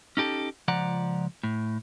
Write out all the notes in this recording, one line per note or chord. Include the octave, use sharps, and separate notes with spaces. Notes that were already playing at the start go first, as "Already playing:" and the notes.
C#4 D#4 G4 A4
C#2 F3 D5 F#5 A#5
A2